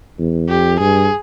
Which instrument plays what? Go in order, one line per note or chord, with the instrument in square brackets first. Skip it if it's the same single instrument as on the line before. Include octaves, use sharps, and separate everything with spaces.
[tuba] E2
[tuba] F2 [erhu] G4
[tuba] G2 [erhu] G#4